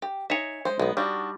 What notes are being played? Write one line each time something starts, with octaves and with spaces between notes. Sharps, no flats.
G4
D#4 C#5 E5 G#5
G#3 C5
B1 G#3 B3
G3 D4 D#4 F#4